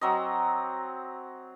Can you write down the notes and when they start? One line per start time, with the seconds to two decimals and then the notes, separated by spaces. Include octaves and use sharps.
0.01 F#3 C4 D#5